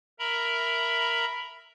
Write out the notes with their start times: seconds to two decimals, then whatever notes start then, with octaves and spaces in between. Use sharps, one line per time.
0.19 A#4 E5 A#5 B5